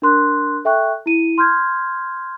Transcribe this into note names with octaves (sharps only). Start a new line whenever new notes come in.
D4 A#4 C6 F#6
A4 E5 G5 C#6 F#6
E4 D#7
C6 F6 G6 G#6